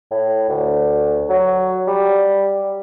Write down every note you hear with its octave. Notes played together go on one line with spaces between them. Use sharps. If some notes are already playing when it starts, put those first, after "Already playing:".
A2
D2
F#3
G3